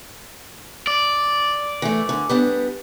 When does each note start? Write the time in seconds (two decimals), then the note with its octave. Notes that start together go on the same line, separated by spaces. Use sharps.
0.87 D5
1.82 E3 A3
2.09 D3
2.29 G3 B3 D4